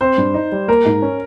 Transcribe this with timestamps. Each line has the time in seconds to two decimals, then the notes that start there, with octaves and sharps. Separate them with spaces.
0.01 C4 C5
0.18 G2
0.34 D#4
0.52 G3
0.68 A#3 A#4
0.85 G#2
1.02 C#4